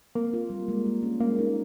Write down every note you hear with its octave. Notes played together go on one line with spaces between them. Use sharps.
A#3 C4
F4
G3
G#3
G#3
C#4
G#3 A#3
D#4